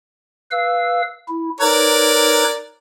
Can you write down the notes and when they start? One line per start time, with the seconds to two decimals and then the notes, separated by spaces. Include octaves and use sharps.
0.52 B4 F5 E6
1.28 E4
1.61 D#4 A#4 B4 C#5 D5